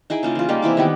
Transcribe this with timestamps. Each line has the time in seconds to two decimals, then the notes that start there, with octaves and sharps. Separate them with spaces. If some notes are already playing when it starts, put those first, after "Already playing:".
0.10 D#4 E4 G#4 G5
0.23 C#3 A#3 F4
0.35 E3 F4
0.49 G3 G#3 A#3 D#4
0.62 C3 E3 E4 D6
0.77 D#3 B3 G4